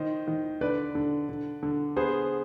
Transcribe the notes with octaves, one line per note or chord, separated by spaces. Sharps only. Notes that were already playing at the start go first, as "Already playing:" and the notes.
Already playing: D#3 C5 D#5
D#3
D3 B4 D5
D3
D3
D3
B3 G#4 C5